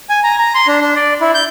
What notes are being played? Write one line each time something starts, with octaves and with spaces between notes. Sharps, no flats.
G#5
A#5
A#5
C6
D4
D4
D5
E4
G6